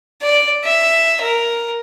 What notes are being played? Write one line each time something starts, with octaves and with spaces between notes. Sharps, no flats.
D5
E5
A#4